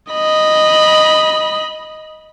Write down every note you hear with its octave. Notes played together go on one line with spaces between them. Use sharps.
D#5 B5